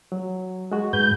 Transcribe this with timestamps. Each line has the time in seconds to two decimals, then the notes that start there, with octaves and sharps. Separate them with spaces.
0.12 F#3
0.72 G#3 F#4
0.93 G#2 B4 G6